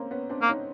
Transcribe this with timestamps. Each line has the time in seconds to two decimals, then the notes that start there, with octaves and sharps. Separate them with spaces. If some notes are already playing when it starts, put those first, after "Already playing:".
Already playing: A#3 C4 C#4
0.11 B3 C#4
0.30 C4 D4
0.42 A#3
0.49 C#4 D#4